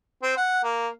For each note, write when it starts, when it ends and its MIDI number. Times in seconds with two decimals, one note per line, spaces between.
0.23 0.35 60
0.37 0.63 78
0.64 0.88 58